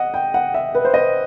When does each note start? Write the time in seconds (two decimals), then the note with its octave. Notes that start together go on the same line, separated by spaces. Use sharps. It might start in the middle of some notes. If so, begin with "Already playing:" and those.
Already playing: D#5 F#5
0.14 G5
0.34 F#5
0.54 E5
0.75 B4
0.85 C5
0.94 D#5